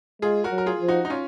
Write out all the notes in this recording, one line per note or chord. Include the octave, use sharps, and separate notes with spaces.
G#3 F4 G#4
F#4 A#4
F#3
A#4
F4 G#4
F3
D#4 F#4
D#4
C#4 F4